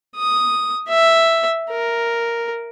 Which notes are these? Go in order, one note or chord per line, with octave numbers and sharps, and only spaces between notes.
D#6
E5
A#4